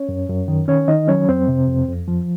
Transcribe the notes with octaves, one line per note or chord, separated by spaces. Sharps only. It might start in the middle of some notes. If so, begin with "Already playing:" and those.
Already playing: C#4 C#5
F#2
F#2
D#3
D#3 C#4 C#5
D#3 D#4 D#5
F#3 C#4 C#5
F2 C4 C5
C3
F2
F2
F3